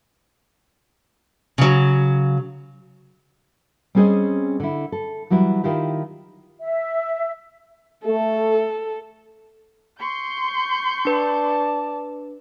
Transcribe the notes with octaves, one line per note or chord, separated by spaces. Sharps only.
C#3 F#3
G3 C4 C#4 G#4 C5 D#5
D3 E4
A4
E3 F#3 G3 E4
D#3 E4 F4 G4
E5
A3 A4
C6 C#6 G6
D4 B4 D5 A5